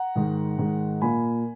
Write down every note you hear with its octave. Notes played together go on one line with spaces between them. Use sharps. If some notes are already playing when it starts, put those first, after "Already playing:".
Already playing: F#5 A#5
G#2 D#3 G#3
G#2 D#3 G#3
A#2 A#3 G#5 B5